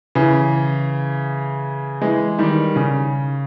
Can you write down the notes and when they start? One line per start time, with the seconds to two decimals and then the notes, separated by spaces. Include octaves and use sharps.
0.15 C#3 E3
2.01 E3 G#3
2.39 D#3 G3
2.76 C#3